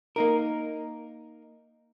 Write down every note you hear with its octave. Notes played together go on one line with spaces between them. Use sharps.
A#3 D#4 A#4